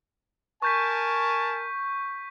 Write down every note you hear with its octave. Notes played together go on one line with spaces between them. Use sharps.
A#4 G#5 A5 C#6 G6 B6